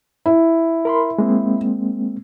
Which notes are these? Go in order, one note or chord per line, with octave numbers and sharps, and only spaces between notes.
E4
A#4 B5 C6
G#3 A#3 C4